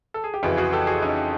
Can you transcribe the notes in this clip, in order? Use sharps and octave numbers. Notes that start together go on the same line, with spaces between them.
A4
G#4
G4
F2 C#3 E3 E4 F#4
F#4 G#4
G4 A4
F#4 G#4
C#4 D#4